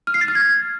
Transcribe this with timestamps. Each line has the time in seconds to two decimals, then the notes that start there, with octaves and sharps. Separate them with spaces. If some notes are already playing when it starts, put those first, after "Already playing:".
0.07 F6
0.14 C7
0.21 A6
0.28 F6
0.35 G#6